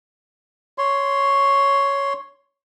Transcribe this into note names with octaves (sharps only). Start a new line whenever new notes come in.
C#5 C6